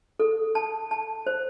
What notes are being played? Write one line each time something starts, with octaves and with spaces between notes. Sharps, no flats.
A4
A5
A5
C5